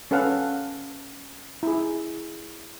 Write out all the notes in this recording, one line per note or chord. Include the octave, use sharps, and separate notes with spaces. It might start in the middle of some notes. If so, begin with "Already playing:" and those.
C#4 A4 B4 F5 F#5
E4 G#4